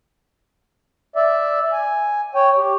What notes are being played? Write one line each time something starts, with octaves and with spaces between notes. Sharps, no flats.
D5 E5
G#5
C#5 G5
G4